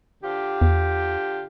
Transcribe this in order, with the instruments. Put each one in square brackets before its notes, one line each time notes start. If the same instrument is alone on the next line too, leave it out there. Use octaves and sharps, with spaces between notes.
[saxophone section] D3 F4 G4
[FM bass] E2